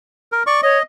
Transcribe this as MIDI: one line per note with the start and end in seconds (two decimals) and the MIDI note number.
0.32 0.43 70
0.47 0.61 74
0.47 0.61 85
0.63 0.78 73
0.63 0.83 75